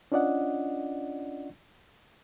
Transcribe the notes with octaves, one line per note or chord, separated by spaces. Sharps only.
C#4 D4 F4 D5 D#5 F#5